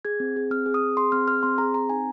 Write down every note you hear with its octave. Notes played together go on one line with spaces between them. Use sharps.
G#4 G#6
C4
G#4
C4 F6
G#4
D#6
C4
G#4 C6
C4 F6
G#4 F6
C4 C6
G#4 A#5
C4 A#5
D#4 G#5